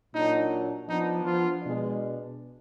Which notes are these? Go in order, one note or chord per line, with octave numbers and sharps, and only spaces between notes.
A#2 F#3 D4 D#4
F3 B3 D4 D#4
F3 F4
B2 G#3 D4